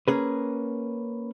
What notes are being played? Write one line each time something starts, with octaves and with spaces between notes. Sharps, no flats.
A#3 C#4 G#4 B4